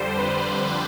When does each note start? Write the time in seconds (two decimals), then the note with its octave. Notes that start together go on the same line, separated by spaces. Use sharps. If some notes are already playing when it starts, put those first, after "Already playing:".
Already playing: F2 D3 G3 C5
0.17 B4